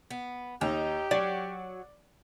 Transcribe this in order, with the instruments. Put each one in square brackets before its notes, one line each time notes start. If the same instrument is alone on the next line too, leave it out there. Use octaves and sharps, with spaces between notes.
[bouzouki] B3
[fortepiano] D#2 [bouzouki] D#4 [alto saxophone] G4
[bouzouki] F#3 [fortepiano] D5